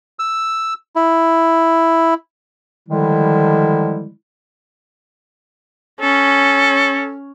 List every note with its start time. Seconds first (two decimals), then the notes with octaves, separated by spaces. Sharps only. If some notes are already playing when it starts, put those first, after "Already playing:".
0.19 E6
0.96 E4
2.89 D3 D#3 F3 G3 G#3 E4
6.01 C#4 A4